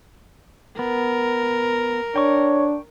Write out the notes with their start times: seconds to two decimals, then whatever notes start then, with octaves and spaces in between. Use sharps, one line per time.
0.79 B3 A#4
2.16 D4 C#5 G5 C#6